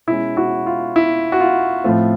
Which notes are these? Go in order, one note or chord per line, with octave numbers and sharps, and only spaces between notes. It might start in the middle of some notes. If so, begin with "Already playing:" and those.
B2 G#3 C#4 E4
E4 F#4
F4
E4
F#4
F4
A2 F3 A3 C4 F4